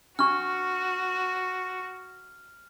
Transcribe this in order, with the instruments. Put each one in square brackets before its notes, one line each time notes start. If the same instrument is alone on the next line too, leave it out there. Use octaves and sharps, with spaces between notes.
[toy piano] D4 C#6 [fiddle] F#4 [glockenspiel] F6